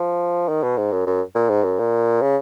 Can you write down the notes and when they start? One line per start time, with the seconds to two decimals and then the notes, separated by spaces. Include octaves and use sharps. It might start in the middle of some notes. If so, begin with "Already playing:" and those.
Already playing: F3
0.49 D#3
0.63 B2
0.77 G#2
0.92 F#2
1.07 F#2
1.35 A#2
1.49 G#2
1.64 F#2
1.79 A#2
2.22 C#3